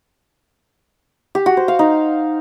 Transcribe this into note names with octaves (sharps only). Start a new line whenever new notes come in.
G4
F#4
C5
F5
D#4